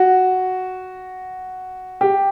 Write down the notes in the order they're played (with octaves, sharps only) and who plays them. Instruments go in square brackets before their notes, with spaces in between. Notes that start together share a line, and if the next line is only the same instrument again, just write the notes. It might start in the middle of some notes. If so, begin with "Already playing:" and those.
Already playing: [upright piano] F#4
G4